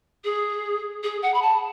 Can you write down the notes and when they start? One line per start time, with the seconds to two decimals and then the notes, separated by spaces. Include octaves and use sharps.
0.24 G#4
1.03 G#4
1.22 F#5
1.34 B5
1.42 A5